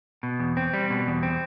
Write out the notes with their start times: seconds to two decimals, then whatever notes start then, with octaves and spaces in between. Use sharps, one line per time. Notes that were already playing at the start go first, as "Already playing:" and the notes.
0.23 B2
0.39 E2
0.57 C4
0.73 G3
0.90 B2
1.07 E2
1.23 C4